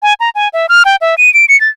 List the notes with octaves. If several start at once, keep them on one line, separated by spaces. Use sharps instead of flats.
G#5
A#5
G#5
E5
F6
G5
E5
D#7
D7
C#7
A6